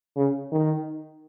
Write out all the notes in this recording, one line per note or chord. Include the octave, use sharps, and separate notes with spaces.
C#3
D#3